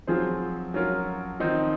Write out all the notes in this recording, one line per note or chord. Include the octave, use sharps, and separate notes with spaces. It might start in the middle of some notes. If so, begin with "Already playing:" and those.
F3 F#3 C4 F4 G#4 C5
F#3 C#4 F4 A#4
D#3 F3 C4 D#4